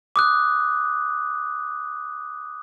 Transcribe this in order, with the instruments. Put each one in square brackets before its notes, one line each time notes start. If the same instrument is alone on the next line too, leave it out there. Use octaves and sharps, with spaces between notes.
[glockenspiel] D6 D#6 F#6